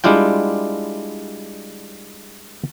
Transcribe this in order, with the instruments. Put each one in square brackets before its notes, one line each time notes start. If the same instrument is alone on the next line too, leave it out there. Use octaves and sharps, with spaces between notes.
[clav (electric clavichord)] G3 G#3 D4 E4 F4 G5